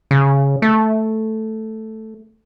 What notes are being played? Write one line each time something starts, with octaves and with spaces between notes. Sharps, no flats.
C#3
A3